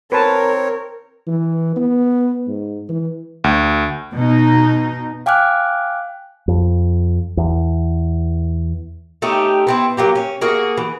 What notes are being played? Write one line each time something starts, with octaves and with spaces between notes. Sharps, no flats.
C4 A#4 B4 C#5 A5
E3
B3
G#2
E3
D2
B2 D#4
F5 G5 G#5 D6 F6 F#6
F2
E2
A3 C#4 D#4 G4
B3 C4 E4
F#3 A#3 G4
C#4
A#3 F#4 G#4
E3